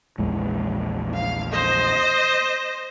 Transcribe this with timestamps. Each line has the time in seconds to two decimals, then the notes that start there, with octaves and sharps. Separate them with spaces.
0.18 A#1 E2 G#3
1.14 F5
1.52 C5 D#5